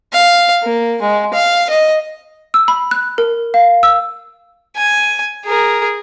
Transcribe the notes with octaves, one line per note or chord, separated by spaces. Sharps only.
F5
A#3
G#3
F5
D#5
E6
B5
F#6
A#4
F5
E6
G#5
G#4 A#4